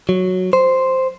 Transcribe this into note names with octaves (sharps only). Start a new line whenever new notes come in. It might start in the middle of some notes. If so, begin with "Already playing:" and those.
F#3
C5